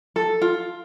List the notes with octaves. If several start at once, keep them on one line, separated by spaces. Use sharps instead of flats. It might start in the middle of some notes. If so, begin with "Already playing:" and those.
A4
F4